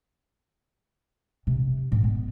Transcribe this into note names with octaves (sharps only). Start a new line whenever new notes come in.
C3
G#2
B3